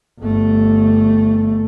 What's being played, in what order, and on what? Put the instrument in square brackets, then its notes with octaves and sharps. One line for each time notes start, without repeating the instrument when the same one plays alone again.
[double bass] G1 A3